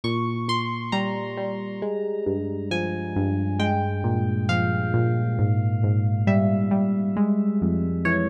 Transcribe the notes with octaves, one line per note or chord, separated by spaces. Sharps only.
A#2 C#6
A#2 C6
G3 A#5
G3
G#3
G2
F3 G#5
G2
G#3 G5
A#2
F3 F5
A#2
G#2
G#2
G3 E5
G3
G#3
F2
E3 C#5